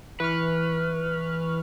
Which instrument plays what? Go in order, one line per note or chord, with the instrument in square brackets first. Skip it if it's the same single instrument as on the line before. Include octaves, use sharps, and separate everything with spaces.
[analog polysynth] E3 C#6 F6 [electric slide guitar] B4